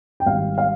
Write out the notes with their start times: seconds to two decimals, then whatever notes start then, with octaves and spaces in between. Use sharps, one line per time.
0.20 G5
0.26 G#1 G#2 G3 F5
0.58 F5